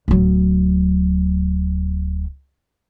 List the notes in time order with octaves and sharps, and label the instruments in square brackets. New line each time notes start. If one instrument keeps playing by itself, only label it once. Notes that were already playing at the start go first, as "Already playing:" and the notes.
[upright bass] D1 F#3